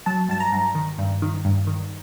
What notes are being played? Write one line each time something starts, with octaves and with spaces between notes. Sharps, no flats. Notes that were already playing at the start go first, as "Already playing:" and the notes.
F#3 A5
G2 A5
A#5
G2
D#3
G2
D#3
G2
D#3